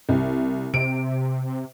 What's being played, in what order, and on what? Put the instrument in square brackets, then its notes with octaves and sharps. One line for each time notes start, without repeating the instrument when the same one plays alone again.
[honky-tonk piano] C2
[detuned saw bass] C3 [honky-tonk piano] D7